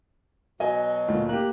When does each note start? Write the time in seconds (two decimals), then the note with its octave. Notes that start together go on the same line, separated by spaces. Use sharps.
0.60 B2 F#3 D#5 G#5
1.08 D2 A#2
1.29 A#3 G4 F#6